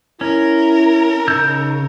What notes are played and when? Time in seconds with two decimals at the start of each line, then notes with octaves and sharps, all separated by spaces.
0.21 C#4 E4 A#4
1.28 C#3 D#4 E6 G6